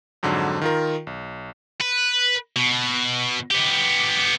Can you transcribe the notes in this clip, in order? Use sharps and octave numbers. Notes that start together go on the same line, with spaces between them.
F2 G#2 D3 F#3
D#3 F4 A#4
B1
B4
B2
B3 G4